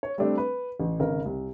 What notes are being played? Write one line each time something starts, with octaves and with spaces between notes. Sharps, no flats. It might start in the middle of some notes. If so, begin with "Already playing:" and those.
C#5
G3 A3 C4 D4
B4
A1
G#1 C#3 A#4
C2